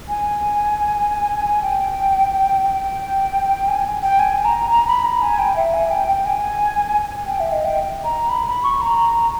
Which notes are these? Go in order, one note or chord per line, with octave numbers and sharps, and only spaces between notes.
G#5
G5
G5
G#5
G5
G#5
A#5
A#5
B5
A#5
G#5
G5
E5
G#5
G5
G5
G#5
G5
E5
D#5
G5
A#5
B5
B5
C#6
A#5